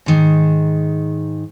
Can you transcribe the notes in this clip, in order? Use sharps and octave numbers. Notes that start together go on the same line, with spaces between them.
G#2 D#3